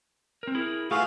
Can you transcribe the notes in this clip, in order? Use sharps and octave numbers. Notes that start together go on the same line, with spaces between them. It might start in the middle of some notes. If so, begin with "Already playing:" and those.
C4 A#4
E4 G#4 A#4
A3 F4 F#4 G#4 B4 F5